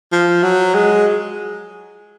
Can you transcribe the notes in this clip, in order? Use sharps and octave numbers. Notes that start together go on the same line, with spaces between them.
F3
F#3
G#3